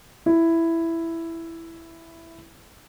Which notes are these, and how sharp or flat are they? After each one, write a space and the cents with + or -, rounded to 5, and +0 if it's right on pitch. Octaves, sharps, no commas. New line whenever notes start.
E4 +5